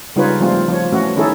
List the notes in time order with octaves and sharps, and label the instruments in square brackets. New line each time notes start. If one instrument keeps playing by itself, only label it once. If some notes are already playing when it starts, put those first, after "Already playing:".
[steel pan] C#3 G3 D#4 F4 B4 C#5
F3 G3 A3 C4 F4
F3 C#5
E3 A3 C#4 F#4
D#3 C#4 D#4 E4 G#4 A4